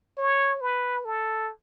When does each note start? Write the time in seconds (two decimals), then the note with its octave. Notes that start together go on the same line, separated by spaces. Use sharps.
0.18 C#5
0.61 B4
1.05 A4